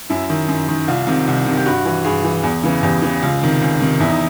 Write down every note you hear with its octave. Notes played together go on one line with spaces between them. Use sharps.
F#2 E4
D#3
F#2
D#3
C2 F4
C3 D#3
C2
C3 D#3
G4
G2 F#4
E3
G2 G#4
E3
E2
C#3 E3
E2 G4
C#3 E3
C#2 F4
C3 D#3
C#2
C3 D#3
E2 E4
D#4